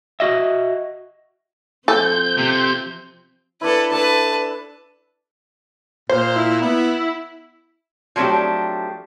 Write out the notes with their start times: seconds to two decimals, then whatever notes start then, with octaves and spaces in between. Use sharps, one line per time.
0.20 F#4 D#5 E5
1.88 F3 C4 A4 G6
2.38 C3
3.61 D4 E4 A4 B4
3.91 D4 A4 B4 A5
6.09 A#2 C5
6.36 E4
6.62 B3
8.16 F3 F#3 A3 C4 D4 G4